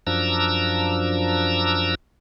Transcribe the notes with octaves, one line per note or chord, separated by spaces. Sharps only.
F#2 F3 D4 A#5 E6